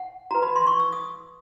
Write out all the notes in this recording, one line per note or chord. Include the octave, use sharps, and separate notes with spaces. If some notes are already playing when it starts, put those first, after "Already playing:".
Already playing: F#5
F#4 B4 A#5
B5
C6
C#6
E6
D#6